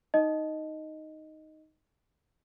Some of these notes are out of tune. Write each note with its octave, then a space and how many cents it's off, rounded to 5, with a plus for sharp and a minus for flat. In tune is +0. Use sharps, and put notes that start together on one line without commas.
D#4 +0 D#5 +0